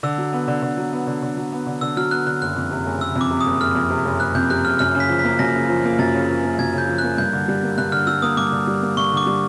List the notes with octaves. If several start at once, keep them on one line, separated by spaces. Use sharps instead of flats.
D3 E6
F#3
B3
D3
D3
F#3
B3
D3
D3
F#3
B3
D3
D3 E6
F#3 F6
B3 F#6
D3 F#6
F#1 F#6
F2
C3
F#1
F#1 E6
F2
D6
C3
D#6
F#1
F#1 F6
F2
C3
F#1
F#1 F#6
F2 G6
C3 F#6
F#1 F6
F#2 F6
C#3
B6
F3
B6
A#3
F#2 A#6
C#3
F3
A#3
F#2 A6
C#3
F3
A#3
F#2 G#6
C#3 G6
F3
F#6
A#3
G2 G6
D3
G3
A#3
G2 F#6
D3 F6
G3 E6
A#3 D#6
G2 D6
D3
G3
A#3
G2 C#6
D3
D6
G3